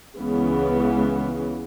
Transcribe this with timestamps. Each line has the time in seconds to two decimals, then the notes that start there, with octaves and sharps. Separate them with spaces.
0.18 C#2 C#3 E3 B3